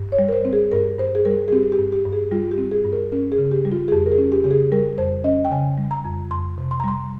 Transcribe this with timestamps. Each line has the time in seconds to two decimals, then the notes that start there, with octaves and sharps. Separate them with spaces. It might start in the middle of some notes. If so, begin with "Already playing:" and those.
Already playing: G2
0.12 C#5
0.19 G3
0.28 A#4
0.33 C5
0.45 C4
0.53 G#4
0.72 G2 A#4
0.98 G2 C5
1.15 G#4
1.25 G3 A#4
1.48 G#4
1.52 C4 G4
1.72 G4
1.79 G2
1.92 G4
2.06 G2
2.12 G#4
2.31 G3 F4
2.51 G4
2.58 C4
2.71 G#4
2.85 G2
2.92 A#4
3.12 C#4 A#4
3.32 G#4
3.38 C#3
3.51 G4
3.65 G3
3.72 F4
3.88 G#4
3.92 F2 G4
4.06 A#4
4.12 G#4
4.18 C#4
4.32 G4
4.44 C#3 G4
4.51 G#4
4.72 G3 A#4
4.98 F2 C5
5.24 C#4 D#5
5.45 G5
5.52 C#3 G#5
5.78 G3
5.91 A#5
6.04 F2
6.31 F2 C6
6.58 C3
6.71 C6
6.80 A#5
6.84 G3 C6